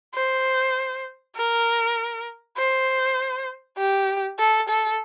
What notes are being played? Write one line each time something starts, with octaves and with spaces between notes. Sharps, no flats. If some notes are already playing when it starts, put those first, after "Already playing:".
C5
A#4
C5
G4
A4
A4